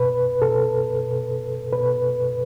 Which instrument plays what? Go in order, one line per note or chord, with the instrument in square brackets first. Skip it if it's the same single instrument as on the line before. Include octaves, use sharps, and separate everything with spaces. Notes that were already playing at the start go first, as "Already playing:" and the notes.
Already playing: [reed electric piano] B2 B4
B2 A4
B2
B2 B4